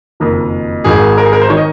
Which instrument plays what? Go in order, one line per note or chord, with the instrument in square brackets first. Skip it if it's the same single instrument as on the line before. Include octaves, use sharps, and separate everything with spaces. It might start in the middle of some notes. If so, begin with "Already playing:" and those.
[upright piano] F#1 F2 D#3 A#4
G#1 G#2 D#3 G#4
A#4
G#4
A#4
C5
D#3 C#5
D#5